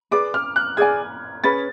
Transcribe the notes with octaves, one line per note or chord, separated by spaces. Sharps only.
G#4 B4 D5 D6
F6
F#6
G#4 D5 G#5 G#6
C#4 G#4 B4 A6